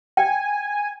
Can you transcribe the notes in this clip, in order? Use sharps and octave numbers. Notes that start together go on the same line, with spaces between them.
G5 G#5